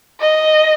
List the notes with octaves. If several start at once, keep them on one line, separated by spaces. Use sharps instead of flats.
D#5